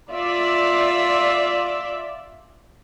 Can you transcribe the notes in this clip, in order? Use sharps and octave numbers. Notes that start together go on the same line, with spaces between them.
F4 D5 E5